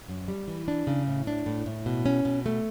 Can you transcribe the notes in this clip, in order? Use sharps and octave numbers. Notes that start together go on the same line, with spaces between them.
F#2
G3
E3
D4
C#3
A2
D4
A2
A2
B2
C#4
B2
A3